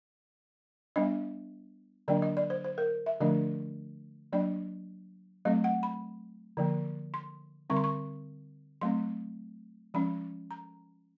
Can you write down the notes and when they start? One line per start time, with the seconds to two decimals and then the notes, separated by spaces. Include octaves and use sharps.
0.96 G3 B3 D4 D#5
2.08 D3 F#3 A#3 D4 D5
2.22 D#5
2.37 D5
2.50 C5
2.64 C5
2.78 A#4
3.06 E5
3.20 D3 F3 A3 D4 D#5
4.33 F#3 A#3 D4 D5
5.45 F#3 A3 C4 D#5
5.64 F#5
5.83 B5
6.57 D3 F3 A#3
7.14 C6
7.70 D3 G3 C4 C#6
7.77 C6
7.84 C#6
8.81 F#3 A3 C4 C6
9.94 F3 G#3 C#4 B5
10.51 A#5